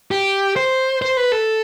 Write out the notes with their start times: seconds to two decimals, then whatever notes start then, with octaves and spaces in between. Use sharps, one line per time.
0.11 G4
0.56 C5
1.02 C5
1.17 B4
1.32 A4